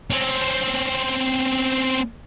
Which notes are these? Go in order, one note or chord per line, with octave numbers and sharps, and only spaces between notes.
C4 C#4